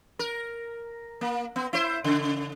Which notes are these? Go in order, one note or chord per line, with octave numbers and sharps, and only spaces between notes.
A#4
A#3
B3
E4 C5
C#3